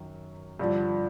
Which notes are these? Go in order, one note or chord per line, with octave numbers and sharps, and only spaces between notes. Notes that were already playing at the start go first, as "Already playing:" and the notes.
Already playing: F#2 D#3
G2 D3 F3